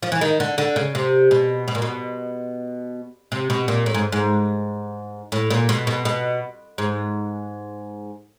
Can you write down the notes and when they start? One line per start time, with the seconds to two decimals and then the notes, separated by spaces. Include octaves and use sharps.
0.03 F3
0.12 E3
0.21 D#3
0.40 D3
0.58 D3
0.76 C#3
0.95 C3
1.31 B2
1.68 B2
1.75 A#2
1.82 B2
3.32 C3
3.50 B2
3.68 A#2
3.86 A2
3.94 G#2
4.12 G#2
5.32 A2
5.50 A#2
5.69 B2
5.87 B2
6.05 B2
6.78 G#2